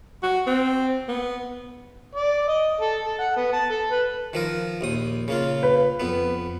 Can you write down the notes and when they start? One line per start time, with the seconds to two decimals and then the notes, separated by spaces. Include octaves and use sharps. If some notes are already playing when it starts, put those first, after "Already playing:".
0.23 F#4
0.47 C4
1.08 B3
2.15 D5
2.48 D#5
2.81 A4
3.04 A4
3.19 F#5
3.36 B3
3.53 A5
3.70 A4
3.91 B4
4.33 D#3 F3 A#4
4.81 A#1 D#2 D#6
5.28 C#3 A#3 F4
5.63 B4
6.00 F2 B3